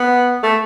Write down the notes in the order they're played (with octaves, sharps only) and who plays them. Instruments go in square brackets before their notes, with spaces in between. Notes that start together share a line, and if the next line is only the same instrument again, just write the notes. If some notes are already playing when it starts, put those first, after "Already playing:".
Already playing: [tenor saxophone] B3
A3